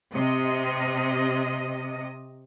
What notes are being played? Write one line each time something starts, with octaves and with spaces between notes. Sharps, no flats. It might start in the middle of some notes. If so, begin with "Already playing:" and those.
C3 D#5